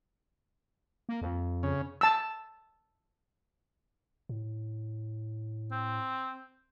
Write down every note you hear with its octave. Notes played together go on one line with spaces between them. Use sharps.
A#3
F2
C#3
A5 E6
A2
C4